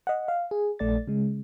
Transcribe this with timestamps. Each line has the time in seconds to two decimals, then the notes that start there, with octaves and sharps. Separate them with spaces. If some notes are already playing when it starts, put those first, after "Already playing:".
0.07 D#5 F#5
0.28 F5
0.51 G#4
0.79 A#1 A3 D5 A6
1.08 C#3 G#3